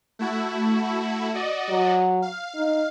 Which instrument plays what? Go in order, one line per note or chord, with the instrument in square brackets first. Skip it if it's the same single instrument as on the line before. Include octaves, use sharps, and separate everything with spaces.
[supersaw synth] A3 E4 F#4
F#4 D5 D#5
[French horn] F#3
[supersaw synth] F5
[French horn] D#4